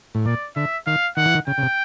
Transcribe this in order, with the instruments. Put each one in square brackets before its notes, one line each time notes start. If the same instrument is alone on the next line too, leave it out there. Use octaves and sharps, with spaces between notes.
[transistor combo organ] A2
[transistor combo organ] A#2 [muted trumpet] D5
[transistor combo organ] D3 [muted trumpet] E5
[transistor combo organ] D#3 [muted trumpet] F5
[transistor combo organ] D#3 [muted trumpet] F#5
[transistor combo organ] E3
D#3
[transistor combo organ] C#3 [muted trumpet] G5
[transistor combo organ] C#3
C3